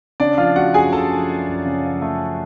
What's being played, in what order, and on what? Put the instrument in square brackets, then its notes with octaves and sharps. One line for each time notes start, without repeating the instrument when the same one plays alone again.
[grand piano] C#3 D4 D5
F3 F4 F5
A3 F#4 F#5
F#2 G#4 G#5
C#3 A4 A5
F3
A3
F#2
C#3
F3
A3